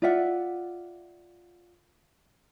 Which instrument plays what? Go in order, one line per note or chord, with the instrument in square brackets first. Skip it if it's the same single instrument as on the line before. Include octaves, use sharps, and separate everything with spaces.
[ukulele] F4 D5 E5 F#5